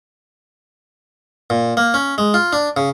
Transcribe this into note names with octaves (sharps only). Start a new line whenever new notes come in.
A#2
A#3
C#4
G#3
F4
D4
C#3